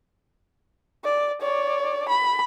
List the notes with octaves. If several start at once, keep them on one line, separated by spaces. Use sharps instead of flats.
D5
C#5 D5
B5